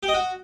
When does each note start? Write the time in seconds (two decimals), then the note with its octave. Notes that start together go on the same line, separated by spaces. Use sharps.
0.03 G4
0.08 D#5
0.14 F#4